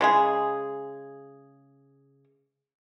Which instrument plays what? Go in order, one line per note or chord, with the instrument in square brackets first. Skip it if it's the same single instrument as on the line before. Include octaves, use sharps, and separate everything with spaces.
[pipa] C#3 G#3 G#4